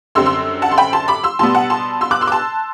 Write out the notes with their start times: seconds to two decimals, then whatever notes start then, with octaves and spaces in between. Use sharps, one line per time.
0.15 F#2 D3 G3 C4 C6 E6
0.26 C6 E6
0.62 F#5 A5
0.71 C6
0.78 G5 B5
0.93 A5 C6
1.08 B5 D6
1.23 C6 E6
1.39 B2 G3 B3 A5 C6
1.55 F#5 A5
1.70 A5 C6
2.01 C6 E6
2.11 D6 F#6
2.21 C6 E6
2.27 D6
2.32 A5 C6